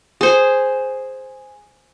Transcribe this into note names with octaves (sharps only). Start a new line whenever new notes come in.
G#4 C5